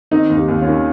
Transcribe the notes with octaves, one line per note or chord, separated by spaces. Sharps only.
D#3 C4 D#4
D#2
D#4 G4
D#2
C#4 F4
D#3